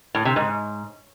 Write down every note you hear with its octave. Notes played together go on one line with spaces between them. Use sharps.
A2
C3
G#2